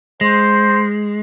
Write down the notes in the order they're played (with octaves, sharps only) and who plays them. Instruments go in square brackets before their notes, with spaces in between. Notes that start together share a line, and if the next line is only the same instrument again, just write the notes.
[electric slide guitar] G#3 [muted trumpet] C5